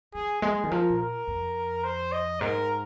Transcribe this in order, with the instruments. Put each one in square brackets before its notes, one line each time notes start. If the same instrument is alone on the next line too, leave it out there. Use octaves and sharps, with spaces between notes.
[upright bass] D#3 [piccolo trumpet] G#4
[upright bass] G#3 [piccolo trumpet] G#4
[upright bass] D#3
[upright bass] F3 [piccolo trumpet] A#4
[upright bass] A#2
[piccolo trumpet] A#4
[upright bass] F2
[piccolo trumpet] C5
D#5
[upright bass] G#2 [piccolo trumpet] A#4